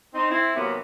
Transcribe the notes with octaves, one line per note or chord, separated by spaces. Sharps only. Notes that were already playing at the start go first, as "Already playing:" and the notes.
C4 D#4
C4 E4
D#2 C3 F#3 A#3 B3